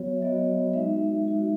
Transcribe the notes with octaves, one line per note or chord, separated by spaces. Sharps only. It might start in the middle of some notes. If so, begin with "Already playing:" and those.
Already playing: F#3 B3 F#4 C#5
E5
F#3 B3 F#4 D#5
G#3 D#4 F#4 E5
G#3 D#4 F#4